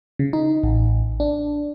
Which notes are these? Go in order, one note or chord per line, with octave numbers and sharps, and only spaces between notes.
C#3
D#4
A1
D4